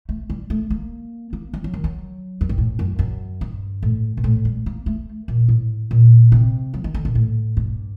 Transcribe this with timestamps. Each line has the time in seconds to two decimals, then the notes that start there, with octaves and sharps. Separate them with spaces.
0.09 A3
0.30 G3
0.50 A3
0.70 A#3
1.33 A#3
1.53 G3
1.64 F#3
1.74 D#3
1.84 F#3
2.41 F#2
2.49 G2
2.58 A2
2.79 F#2
2.99 F#2
3.41 G2
3.83 A2
4.17 A#2
4.24 A2
4.45 G3
4.66 A#3
4.86 A3
5.28 A#2
5.48 A2
5.91 A#2
6.32 C3
6.74 F#3
6.84 D#3
6.94 D3
7.05 A#2
7.15 A2
7.57 G2